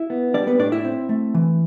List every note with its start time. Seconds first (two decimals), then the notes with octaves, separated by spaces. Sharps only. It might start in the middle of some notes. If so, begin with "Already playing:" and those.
Already playing: E4 E5
0.10 B3
0.34 G3 D4 D5
0.47 B3 B4
0.59 A2 D4 D5
0.72 E4 E5
0.85 C4
1.09 A3
1.34 E3